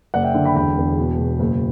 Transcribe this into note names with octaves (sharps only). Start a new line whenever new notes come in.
F#1 D5 F#5
E5 G5
D3
G5 B5
E1 G5 B5
E2
B2
B2
F#1